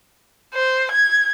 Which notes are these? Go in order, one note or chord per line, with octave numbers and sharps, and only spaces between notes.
C5
G#6